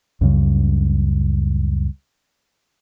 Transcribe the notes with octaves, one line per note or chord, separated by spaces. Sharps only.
C#2 F#2 C#3 G3